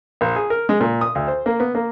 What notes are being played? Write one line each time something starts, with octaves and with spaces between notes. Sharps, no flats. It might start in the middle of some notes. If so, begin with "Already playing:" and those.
A#1
G#4
A#4
G#3
A#2
D#6
D2
C5
A#3
B3
A#3